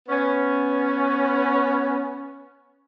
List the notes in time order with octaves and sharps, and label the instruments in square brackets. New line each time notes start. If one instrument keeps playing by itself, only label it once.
[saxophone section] B3 C#4